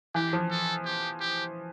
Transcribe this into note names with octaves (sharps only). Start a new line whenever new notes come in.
E3 G4
F3
A4
G4
G4